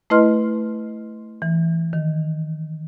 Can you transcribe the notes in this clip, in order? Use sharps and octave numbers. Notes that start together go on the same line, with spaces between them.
A3 E4 B4 D#5 C6 F6
E3
D#3